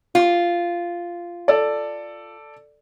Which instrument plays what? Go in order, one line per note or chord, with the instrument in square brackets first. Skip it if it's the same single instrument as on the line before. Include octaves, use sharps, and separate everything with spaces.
[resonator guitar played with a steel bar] F4
[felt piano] A4 D5